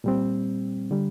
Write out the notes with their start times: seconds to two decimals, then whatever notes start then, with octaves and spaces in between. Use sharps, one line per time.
0.04 A#2 G3 C4
0.91 D3 G3